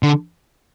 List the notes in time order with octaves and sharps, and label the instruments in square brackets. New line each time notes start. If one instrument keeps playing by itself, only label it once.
[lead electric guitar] D3